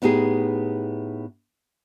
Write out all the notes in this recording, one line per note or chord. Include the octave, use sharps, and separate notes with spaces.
A2 B3 D#4 G4 G#4